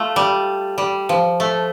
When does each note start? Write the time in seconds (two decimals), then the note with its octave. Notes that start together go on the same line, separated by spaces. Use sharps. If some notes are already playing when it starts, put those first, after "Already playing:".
Already playing: A3 F4
0.16 G3
0.78 G3
1.09 F3
1.40 A3